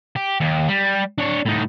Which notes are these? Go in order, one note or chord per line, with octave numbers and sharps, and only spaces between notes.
G4
D#2
G3
D4 C#5
A2 D#4